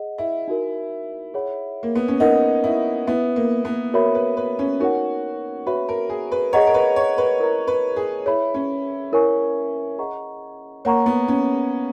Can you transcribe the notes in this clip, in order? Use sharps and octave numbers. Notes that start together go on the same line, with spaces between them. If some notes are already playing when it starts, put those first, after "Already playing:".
Already playing: G#4 D#5 F#5
E4
D#4 F#4 A#4
G#4 C#5 F#5 B5
A#3
B3
C#4
D#4 A#4 D#5 F#5
E4
B3 E4 B4 E5
A#3
B3
F#4 A#4 C#5 E5 B5
B4
B4
C#4
D#4 F#4 A#4 C#5 F#5
F#4 B4 C#5 E5 B5
A#4
G#4
B4
G#4 C#5 D#5 F#5 A#5
A#4
B4
C#5
B4
E4 A#4 D#5 A#5
B4
G#4
E4 G#4 C#5 E5 B5
C#4
E4 A#4 C#5 G#5 C#6
G#4 D#5 F#5 A#5 C#6
A#3 C#5 F#5 A#5 C#6
B3
C#4